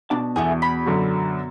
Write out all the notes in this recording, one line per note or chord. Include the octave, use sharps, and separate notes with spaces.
B2 D4 A5
E2 A3 B3 G#4
B5
F#2 D3 F#3